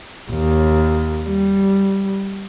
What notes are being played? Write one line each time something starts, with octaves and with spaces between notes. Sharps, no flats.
D#2
G3